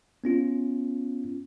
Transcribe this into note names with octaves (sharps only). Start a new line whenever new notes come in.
B3 C#4 F4